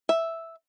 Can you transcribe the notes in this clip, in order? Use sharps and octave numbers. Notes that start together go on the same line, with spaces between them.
E5